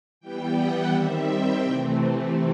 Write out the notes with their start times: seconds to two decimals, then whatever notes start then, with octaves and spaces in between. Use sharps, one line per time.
0.20 E3 G3 B3 G5
0.55 F#5
0.91 D#3 G3 C4 E5
1.27 G5
1.62 C3 E3 A3 C4